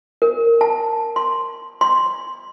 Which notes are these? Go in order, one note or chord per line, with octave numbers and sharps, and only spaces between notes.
A#4
A5
C6
C6